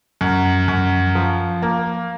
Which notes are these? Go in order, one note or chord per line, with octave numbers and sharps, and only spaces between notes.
F#2
F#2
F3
A#3